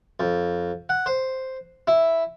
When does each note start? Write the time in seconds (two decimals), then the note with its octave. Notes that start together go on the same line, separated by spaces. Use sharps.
0.20 F2
0.89 F#5
1.06 C5
1.87 E4